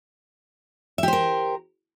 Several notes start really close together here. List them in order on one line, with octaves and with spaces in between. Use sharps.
E5 G4 C5 A#4